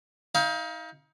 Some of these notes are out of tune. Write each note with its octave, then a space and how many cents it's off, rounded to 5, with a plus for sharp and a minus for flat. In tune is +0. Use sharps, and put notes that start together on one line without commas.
D#4 +35 F5 -10